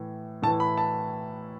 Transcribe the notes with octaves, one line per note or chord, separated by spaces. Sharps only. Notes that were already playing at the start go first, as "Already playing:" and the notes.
Already playing: A2 E3
A2 E3 A5
B5
A5